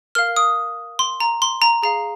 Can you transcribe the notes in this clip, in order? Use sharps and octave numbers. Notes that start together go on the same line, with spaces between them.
A#4 F5 F6
D#6
C6
A#5
C6
A#5
G#4 F5 A#5